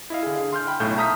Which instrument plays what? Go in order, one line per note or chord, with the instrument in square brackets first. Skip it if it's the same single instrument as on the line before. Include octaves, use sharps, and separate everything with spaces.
[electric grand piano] E4 D#5 F5
D3 G#4
C6 F6 G6
G5 B5
B1 A2 A3 G6
E5 A5 A#5 D#6 F6 B6